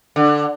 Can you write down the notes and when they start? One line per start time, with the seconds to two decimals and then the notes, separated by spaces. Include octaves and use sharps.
0.16 D3